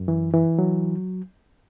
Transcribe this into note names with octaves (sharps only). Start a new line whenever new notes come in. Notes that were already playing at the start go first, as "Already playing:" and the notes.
Already playing: F#2
E3
E3
F#3